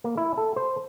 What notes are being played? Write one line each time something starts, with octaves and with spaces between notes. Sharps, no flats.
A#3
E4
A4
C5